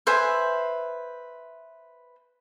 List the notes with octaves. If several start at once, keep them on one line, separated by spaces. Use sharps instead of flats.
B4 C5 E5 G#5